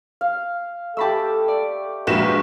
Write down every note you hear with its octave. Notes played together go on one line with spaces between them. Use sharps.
F5
A3 G4 A4 A5 B5 E6
D5
A#1 G#2 F3 F#4 B4 A#5 C#6 E7